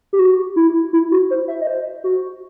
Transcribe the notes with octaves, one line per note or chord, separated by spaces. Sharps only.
G4
F#4
E4
E4
F#4
C5
E5
D#5
C5
F#4